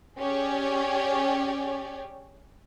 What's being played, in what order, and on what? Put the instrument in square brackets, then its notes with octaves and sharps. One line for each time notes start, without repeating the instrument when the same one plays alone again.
[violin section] C#4 G4 G#4 C#5 D5